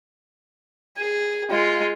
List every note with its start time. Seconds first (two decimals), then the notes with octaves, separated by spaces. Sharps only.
0.97 G#4
1.50 G#3 F4